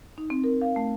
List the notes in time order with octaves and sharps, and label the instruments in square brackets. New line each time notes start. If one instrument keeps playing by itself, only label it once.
[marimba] D#4
C4
A#4
F5
A3